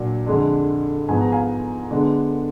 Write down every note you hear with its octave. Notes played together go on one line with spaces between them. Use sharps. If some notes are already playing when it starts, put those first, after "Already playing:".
Already playing: A#2 F#3 D4
F2 D3 G#3 D4
G#2 F3 B3 G#5
A#5
F5 G#5
D3 G#3 B3 D4